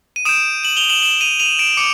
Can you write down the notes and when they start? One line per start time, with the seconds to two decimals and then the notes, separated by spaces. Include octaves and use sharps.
0.16 D#7
0.25 D#6 G6 D7 E7
0.64 E7 F#7
0.77 F7 G7
0.89 E7 F#7
1.01 E7 F#7
1.21 D#7 F7
1.39 D#7 F7
1.59 D7 E7
1.77 D6 C#7 D#7